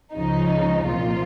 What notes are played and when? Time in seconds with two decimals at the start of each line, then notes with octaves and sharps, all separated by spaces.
0.13 C#2 C#3 F3 D#4
0.87 C2 A#2 F3 F4